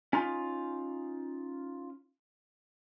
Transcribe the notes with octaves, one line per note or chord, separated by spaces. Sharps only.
C#4 D#4 F4